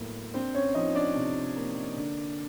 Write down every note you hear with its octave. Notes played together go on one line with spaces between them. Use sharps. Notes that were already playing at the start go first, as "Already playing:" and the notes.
Already playing: A2 F#3 A#3 B3
C4 D4 C5
C#4 C#5
F3 D#4 D#5
D4 D5
C3
A#3
D3